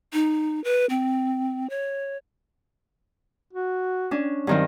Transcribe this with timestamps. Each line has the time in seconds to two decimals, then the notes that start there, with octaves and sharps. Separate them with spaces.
0.13 D#4
0.64 B4
0.90 C4
1.70 C#5
3.53 F#4
4.11 C#4 D4
4.47 G2 D#3 F#3 C4